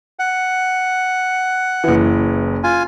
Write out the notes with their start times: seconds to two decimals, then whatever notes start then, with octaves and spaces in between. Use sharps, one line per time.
0.19 F#5
1.84 F#1 E3
2.64 F4 G#5